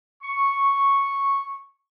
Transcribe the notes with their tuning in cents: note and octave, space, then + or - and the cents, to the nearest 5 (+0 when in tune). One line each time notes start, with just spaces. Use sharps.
C#6 -5